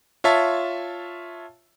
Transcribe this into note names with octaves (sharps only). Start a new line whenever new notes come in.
F4 C#5 E5 A5